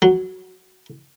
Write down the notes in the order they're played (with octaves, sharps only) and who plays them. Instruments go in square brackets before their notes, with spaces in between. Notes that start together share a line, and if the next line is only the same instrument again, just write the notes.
[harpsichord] F#3